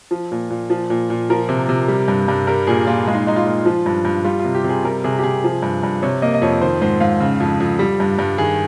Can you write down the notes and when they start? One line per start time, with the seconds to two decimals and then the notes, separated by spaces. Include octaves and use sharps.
0.11 F3
0.32 A#2
0.50 A#2
0.70 F3
0.90 A#2
1.10 A#2
1.30 F3 A#4
1.49 C3
1.69 C3
1.88 G3
2.08 G2
2.28 G2
2.47 G3 A#4
2.67 A#2 G#4
2.87 A#2 F4
3.07 G#3 F4
3.15 D#4
3.27 G#3 D#4
3.36 F4
3.47 A#2
3.65 F3
3.86 G2
4.05 G2
4.25 G3 F4
4.39 F4
4.45 C3
4.55 G4
4.64 C3
4.69 G#4
4.85 G3 A#4
5.04 C3 G#4
5.18 G4
5.24 C3 G#4
5.44 F3
5.62 G2
5.83 G2
6.02 C3 C#5
6.22 A#3 D#5
6.34 D#5
6.42 F2 C#5
6.61 D#3 C5
6.81 G#2 C5
7.00 G#2 F5
7.20 C#3
7.40 F2
7.60 F2
7.79 G3
8.00 G2
8.19 G2
8.38 D#3 G#4